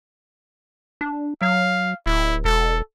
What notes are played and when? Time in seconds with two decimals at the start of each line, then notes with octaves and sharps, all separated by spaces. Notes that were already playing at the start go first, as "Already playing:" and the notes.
1.01 D4
1.41 F#3 F5
2.06 D1 E4
2.45 E1 A4